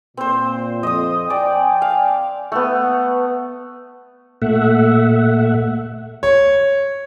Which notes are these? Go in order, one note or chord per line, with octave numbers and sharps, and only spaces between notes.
A#2 C4 C5
F2 D#5 D#6
D5 G5 G#5
F5
A3 B3
A#2 A3 E5 F#5
C#5